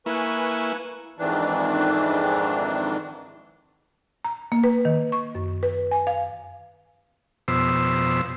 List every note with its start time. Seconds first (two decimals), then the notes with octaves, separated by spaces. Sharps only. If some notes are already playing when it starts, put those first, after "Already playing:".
0.06 A#3 E4 B4 G#5 C#6
1.19 F2 G#2 D#3 E3 D4
4.25 A#5
4.52 A#3
4.64 B4
4.85 D#3
5.12 C#6
5.35 F#2
5.63 B4
5.91 G#5
6.07 F5
7.48 F2 B2 C5 E6